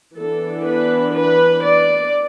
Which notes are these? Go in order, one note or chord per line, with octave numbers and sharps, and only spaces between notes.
E3 B3 D4 A4
B4
B4
D5